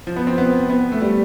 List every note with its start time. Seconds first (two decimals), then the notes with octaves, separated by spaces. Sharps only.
0.07 F3
0.16 B3
0.27 C4
0.38 B3
0.70 B3
0.92 A3
1.02 G3